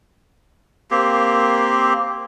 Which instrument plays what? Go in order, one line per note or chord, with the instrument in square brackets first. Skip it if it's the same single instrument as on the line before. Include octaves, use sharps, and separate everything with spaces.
[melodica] A#3 C4 G4